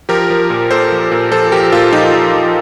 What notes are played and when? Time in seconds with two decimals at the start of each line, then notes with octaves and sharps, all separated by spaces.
0.09 F3 G4 A#4
0.30 F3
0.50 A#2
0.71 A#2 A4 C5
0.92 F3
1.11 A#2
1.31 F3 A4 C5
1.52 F3 G4 A#4
1.72 A#2 F4 A4
1.93 F3 D#4 G4
2.13 F3
2.34 F3